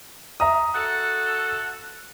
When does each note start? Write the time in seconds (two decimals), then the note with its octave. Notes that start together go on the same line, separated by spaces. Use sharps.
0.40 E5 A#5 D#6
0.75 F#4 A4